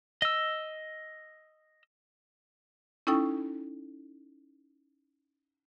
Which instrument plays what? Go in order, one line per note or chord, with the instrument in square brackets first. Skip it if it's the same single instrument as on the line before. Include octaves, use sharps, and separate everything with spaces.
[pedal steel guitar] D#5 E6
[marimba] C#4 D#4 E4 A4 G5 C#6